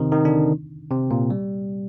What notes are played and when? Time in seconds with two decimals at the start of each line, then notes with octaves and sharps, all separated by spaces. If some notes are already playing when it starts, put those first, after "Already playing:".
Already playing: C3 D#3 C4 D#4
0.12 D#3 D#4
0.25 D3 D4
0.91 C3 C4
1.11 A#2 A#3
1.30 G3